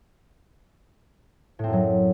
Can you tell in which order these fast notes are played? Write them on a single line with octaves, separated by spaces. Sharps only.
A2 C4 F#2 F#3